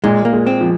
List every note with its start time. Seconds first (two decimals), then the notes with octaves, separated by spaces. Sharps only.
0.04 A#2 G#3
0.25 A#3
0.33 G#3
0.47 C4
0.61 F3